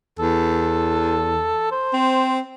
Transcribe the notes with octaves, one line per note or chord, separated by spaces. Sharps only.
E2 A4
C5
C4